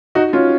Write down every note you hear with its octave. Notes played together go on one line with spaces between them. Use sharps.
D#4 F#4
C#4 F4